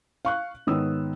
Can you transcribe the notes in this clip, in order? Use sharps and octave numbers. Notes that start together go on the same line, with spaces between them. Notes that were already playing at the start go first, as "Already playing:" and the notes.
F5 C#6 F#6
G#2 D#3 B3 C#5 D#6 E6